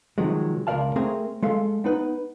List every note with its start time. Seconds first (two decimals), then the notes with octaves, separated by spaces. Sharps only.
0.18 C3 D#3 F3 F#3 G#3
0.67 C#2 A#4 B4 D5 F5 A5
0.96 A3 C4 G#4 A#4
1.43 G#3 A4 F5
1.84 B3 D#4 B4